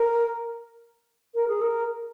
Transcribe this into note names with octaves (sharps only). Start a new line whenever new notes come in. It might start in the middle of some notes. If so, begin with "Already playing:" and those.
Already playing: A#4
A#4
G#4
A#4